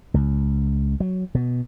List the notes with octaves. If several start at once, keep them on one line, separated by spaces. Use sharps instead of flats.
C#2
F#3
B2